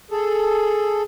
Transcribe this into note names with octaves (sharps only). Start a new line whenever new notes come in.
G#4 A4